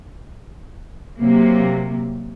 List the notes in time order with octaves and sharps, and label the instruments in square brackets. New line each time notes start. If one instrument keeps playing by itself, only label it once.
[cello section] C3 F#3 A#3